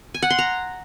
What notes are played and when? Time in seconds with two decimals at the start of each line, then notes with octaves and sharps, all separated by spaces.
0.14 G#5
0.22 F#5
0.31 C6
0.39 A#5